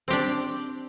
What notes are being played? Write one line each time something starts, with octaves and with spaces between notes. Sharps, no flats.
C4 D4 G4